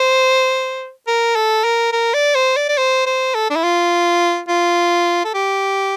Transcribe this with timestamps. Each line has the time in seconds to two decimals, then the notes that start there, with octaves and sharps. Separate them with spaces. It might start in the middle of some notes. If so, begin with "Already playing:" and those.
Already playing: C5
1.07 A#4
1.36 A4
1.64 A#4
1.92 A#4
2.14 D5
2.35 C5
2.57 D5
2.69 D5
2.78 C5
3.07 C5
3.35 A4
3.50 D4
3.56 E4
3.64 F4
4.48 F4
5.25 A4
5.34 G4